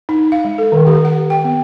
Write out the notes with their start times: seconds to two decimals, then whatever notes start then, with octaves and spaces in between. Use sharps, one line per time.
0.09 D#4
0.32 F5
0.45 G#3
0.58 A4
0.72 D#3
0.87 G4
1.05 F#5
1.30 G5
1.44 B3